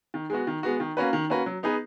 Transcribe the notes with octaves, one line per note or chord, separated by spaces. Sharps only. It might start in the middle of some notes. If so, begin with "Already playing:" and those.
D#3
G#3 B3 F#4
D#3
G#3 B3 F#4
D#3
A#3 C#4 F#4 B4
D#3
A#3 C#4 F#4 B4
F#3
B3 D#4 G#4 B4